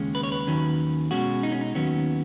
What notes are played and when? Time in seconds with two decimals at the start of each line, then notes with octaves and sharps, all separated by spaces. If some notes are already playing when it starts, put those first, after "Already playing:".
Already playing: D#2 C#3 G#3 C#4
0.15 B4
0.23 C#5
0.32 B4
0.47 D#2 D#3 F#3 C#4
1.11 B2 G#3 C#4 F#4
1.43 D#4
1.52 C#4
1.61 D#4
1.75 D#2 D#3 F#3 B3 C#4